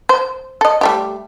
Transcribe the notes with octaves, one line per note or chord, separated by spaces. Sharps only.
C5
A4 D#5
G3 A3 G4